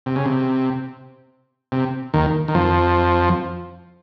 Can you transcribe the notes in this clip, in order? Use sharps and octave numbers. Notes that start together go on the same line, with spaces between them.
C3
C#3
C3
C3
D#2 D#3
D#3
F2 F3